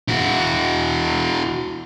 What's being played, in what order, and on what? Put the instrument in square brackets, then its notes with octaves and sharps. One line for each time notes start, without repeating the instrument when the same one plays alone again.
[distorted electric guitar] E4 F#4